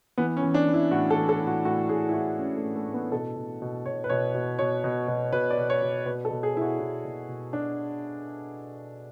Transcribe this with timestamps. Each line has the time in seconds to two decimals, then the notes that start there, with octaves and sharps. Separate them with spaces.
0.18 E3 B3
0.37 C#4
0.42 E3
0.54 D4
0.67 E3
0.74 E4
0.91 A2 F#4
1.10 A4
1.16 E3
1.29 A4
1.40 A2
1.47 F#4
1.65 A2 F#4
1.89 A2 G#4
2.09 E4
2.14 A2 F#4
2.38 A2 C#4
2.57 A3
2.63 A2
2.76 A3
2.88 A2
2.94 B3
3.12 B2 A4
3.36 B2
3.62 B2
3.86 B2 C#5
4.04 B4
4.10 B2 C#5
4.35 B2
4.59 B2 C#5
4.84 B2
5.08 B2
5.33 B2 B4
5.51 D5
5.57 B2
5.70 C#5
5.82 B2
6.06 B2 B4
6.25 A4
6.31 B2
6.43 G#4
6.55 B2 E4
6.61 F#4
6.79 B2 E4
7.05 B2
7.29 B2
7.53 B2 D4